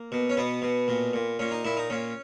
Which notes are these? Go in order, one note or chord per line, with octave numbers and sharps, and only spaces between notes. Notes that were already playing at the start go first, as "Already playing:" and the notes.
Already playing: A#3
B2
C#4
B2 B3
B2
A#2
A#2
A#2 C#4
D#4
A#2 E4
D#4
A#2 C#4